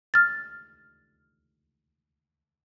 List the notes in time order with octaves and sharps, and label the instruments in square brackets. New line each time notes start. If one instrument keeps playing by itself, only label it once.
[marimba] F6 A6